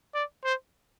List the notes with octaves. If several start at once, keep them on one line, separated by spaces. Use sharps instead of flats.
D5
C5